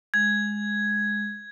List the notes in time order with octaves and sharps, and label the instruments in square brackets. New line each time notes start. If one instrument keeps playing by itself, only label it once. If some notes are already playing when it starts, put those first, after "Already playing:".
[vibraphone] G#3 [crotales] G#6